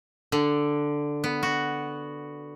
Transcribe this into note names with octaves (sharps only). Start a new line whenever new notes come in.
D3
B3
F#4